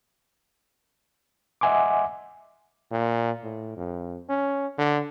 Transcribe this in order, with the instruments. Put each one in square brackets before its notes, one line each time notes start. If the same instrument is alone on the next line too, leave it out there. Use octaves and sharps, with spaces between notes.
[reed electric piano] D#5 E5 F#5 G#5 C6 D6
[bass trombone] A#2
A2
F2
C#4
D3